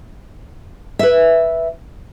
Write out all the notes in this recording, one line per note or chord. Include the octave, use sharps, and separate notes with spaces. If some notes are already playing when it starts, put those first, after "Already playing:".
B4 E5